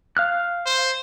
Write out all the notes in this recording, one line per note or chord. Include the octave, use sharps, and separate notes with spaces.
F5 F6 F#6
C5